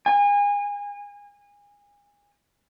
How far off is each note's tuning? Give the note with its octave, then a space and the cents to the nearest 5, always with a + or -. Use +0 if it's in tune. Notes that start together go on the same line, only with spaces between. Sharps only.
G#5 -30